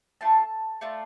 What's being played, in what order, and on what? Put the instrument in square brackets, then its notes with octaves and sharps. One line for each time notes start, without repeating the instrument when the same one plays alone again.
[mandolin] A3 D4 F4 A5
A3 D4 F4